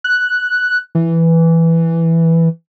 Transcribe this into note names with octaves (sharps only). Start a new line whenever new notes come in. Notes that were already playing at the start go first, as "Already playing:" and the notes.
F#6
E3